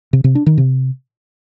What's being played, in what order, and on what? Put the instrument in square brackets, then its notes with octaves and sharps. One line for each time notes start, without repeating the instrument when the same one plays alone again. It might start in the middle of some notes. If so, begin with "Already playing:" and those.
[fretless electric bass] C3
C3
D4
D#3
C3